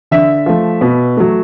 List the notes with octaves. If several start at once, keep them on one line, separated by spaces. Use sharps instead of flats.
D3 E5
F3 A3
B2
F#3 A3